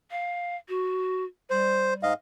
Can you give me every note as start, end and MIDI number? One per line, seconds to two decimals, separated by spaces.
0.11 0.56 77
0.69 1.24 66
1.50 2.05 55
1.50 1.94 72
2.03 2.14 44
2.03 2.14 75
2.03 2.14 77